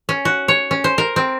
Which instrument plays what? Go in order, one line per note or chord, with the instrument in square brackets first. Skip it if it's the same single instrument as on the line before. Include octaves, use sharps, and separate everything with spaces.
[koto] C#4
F#4
C#5
C#4
C5
A#4
C4